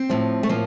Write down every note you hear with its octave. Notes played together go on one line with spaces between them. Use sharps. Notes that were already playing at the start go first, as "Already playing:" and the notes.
Already playing: C4
A2 F3
A3
A2 F3 A#3